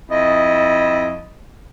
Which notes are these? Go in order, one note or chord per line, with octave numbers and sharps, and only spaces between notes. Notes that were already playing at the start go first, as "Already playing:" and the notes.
F2 E4 D#5